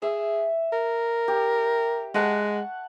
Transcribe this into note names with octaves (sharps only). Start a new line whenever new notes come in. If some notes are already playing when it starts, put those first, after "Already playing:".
G#4 E5
A#4
G4
G#3 F#5 A5 C#6